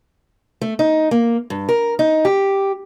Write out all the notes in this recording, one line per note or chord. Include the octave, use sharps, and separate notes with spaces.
A3
D#4
A#3
G2
A#4
D#4
G4